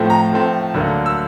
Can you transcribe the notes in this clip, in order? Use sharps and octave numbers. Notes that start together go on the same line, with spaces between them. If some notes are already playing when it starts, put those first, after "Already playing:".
Already playing: A2 F3 A3 C4
A#5
A2 F3 A3 C4
D2 D3 F#3 A#3
E6